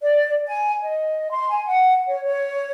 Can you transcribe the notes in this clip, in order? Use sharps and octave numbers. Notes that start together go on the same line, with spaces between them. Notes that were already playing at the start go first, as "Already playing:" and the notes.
D5
G#5
D#5
C6
G#5
F#5
C#5
C#5